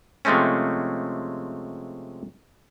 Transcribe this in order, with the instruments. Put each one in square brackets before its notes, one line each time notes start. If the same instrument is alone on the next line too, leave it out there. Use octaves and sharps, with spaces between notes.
[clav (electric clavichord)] C3 F3 G#3 A3 C4 C#4